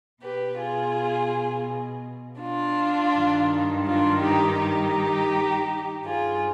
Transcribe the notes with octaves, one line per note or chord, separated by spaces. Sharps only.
B2 G4 B4
F4 G#4
D4 F4
G2 D#3
D4 F4
D#4 G4
D#4 G4
G2 F3 F4 G#4